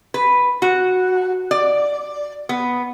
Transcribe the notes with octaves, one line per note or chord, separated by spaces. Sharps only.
B4
F#4
D5
B3